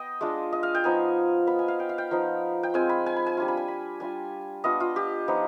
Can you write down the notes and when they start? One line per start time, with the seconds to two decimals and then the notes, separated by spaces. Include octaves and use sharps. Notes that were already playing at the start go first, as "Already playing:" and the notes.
Already playing: B3 D#5 G5
0.21 G#3 D4 F4
0.52 D#5
0.63 F5
0.75 G5
0.84 F3 B3 D#4 G#5
1.47 B3 F4 B5
1.59 G#5
1.68 F5
1.80 G5
1.89 F5
1.98 G5
2.11 F3 B3 D#4
2.63 G5
2.74 G#3 C4 F4 G#5
2.89 B5
3.06 G#5
3.16 B5
3.26 G#5
3.37 G3 D4 F4
3.48 B5
3.57 G#5
3.68 B5
4.00 G3 D4 F4 G#5
4.64 B3 D4 F4 D#5
4.80 F4
4.96 G4
5.28 F3 B3 D#4